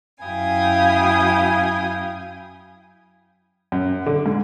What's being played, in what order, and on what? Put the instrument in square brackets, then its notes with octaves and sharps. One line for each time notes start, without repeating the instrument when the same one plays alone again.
[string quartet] F#2 E4 F5 G5 G#5 D#6
[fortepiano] F#2
D3
G#2